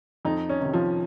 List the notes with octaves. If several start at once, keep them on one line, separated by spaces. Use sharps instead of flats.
F2 D#4
C#4
C3 D#3
F3